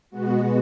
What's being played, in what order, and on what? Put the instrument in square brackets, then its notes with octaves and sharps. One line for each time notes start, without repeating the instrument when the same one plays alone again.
[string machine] B2 G#3 B3 F#4